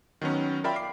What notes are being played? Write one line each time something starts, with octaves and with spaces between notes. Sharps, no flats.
D#3 F#3 B3 C#4
F4 A#4 D5 E5 G5 B5
D6 C7